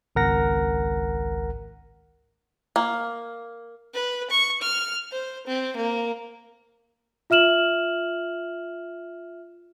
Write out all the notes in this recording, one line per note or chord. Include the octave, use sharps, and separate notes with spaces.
G#1 C#2 A#4 F#5 A#6
A#3
B4
C#6
F6
C5
C4
A#3
F4 E5 F6 E7 F#7